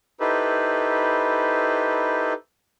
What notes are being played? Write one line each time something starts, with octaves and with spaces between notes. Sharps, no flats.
D#4 E4 G4 A4 B4 C5